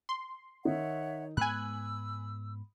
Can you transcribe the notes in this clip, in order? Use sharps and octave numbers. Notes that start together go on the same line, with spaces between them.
C6
D#3 D#4 C#5 E5 F#5
G#2 B3 G#5 B5 E6 F#6